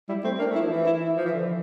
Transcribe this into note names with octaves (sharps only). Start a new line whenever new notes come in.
G3 E4
A3 C4
A#3 D4
A3
E4
F3
E3
E4
E4
F3
E3
D3 F3